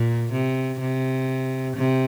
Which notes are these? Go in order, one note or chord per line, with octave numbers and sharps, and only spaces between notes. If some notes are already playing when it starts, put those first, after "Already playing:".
Already playing: A#2
C3
C3
C3